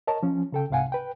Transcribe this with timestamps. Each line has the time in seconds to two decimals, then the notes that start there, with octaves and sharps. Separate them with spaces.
0.07 A#4 C#5 D#5 A5
0.23 F3 C#4
0.52 C#3 A4 G5
0.70 C2 G#2 C3 F5 F#5 G#5
0.92 B4 G5